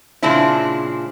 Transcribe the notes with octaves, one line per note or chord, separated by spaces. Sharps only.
A#2 C#3 G#3 C4 D4 E4